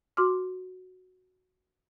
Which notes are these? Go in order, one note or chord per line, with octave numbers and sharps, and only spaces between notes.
F#4 C6 D6 F6